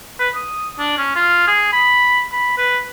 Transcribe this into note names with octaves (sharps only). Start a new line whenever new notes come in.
B4
D#6
D4
C#4
F4
G#4
B5
B5
B4